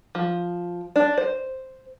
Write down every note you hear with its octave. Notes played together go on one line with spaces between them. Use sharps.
F3
D4
C5